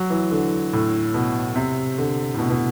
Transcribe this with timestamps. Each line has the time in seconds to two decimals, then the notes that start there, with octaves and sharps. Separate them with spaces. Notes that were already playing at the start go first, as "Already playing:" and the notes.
Already playing: F#3
0.10 E3
0.31 D3
0.73 A2
1.14 B2
1.56 C3
1.98 D3
2.34 A2
2.39 B2
2.50 B2